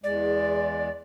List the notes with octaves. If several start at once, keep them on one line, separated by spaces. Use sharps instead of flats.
E2 G#3 D5